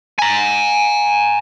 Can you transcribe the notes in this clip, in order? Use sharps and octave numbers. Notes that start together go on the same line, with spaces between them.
G#5 A#5